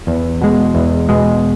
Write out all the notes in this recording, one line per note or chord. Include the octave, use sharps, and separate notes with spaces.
E2
B2 G#3
E2
B2 G#3